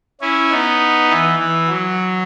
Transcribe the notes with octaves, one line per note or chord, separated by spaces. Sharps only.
C#4 E4
B3 D#4
E3
E3
F#3